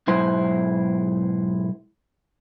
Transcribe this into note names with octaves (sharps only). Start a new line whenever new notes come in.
B1 G#2 E4 C5